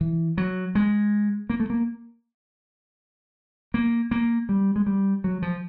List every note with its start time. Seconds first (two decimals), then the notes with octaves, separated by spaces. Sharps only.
0.01 E3
0.38 F#3
0.75 G#3
1.50 A#3
1.60 A3
1.70 A#3
3.74 A#3
4.11 A#3
4.49 G3
4.76 G#3
4.86 G3
5.24 F#3
5.42 F3